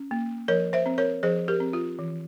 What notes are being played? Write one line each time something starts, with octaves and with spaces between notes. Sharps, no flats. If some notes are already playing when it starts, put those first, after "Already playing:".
Already playing: C#4
A#3
F3 A#4 C#5
C5 E5
C4
A#4 C#5
F3 G#4 C5
G4 A#4
C4
F4
E3